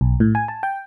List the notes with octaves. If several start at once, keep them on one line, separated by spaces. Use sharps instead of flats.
B1
A2
G#5
A5
G5